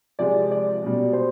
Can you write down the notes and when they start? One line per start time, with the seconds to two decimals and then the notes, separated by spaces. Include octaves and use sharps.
0.19 C3 F3 G#3 D5
0.51 D5
0.82 B2 G3
1.13 C5